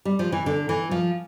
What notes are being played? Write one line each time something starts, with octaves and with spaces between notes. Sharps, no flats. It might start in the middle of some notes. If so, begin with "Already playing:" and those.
G3
F3
E3
D3
E3
F3